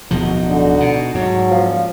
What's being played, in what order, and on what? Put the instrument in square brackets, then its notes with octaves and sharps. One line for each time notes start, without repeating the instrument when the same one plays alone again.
[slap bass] D1 B2 F3 [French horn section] D#4 F#4
[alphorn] D3
[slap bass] B2
[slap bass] G#2 [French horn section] D3 A3 [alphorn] F#3
[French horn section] C#3 G3 A#3 [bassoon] F3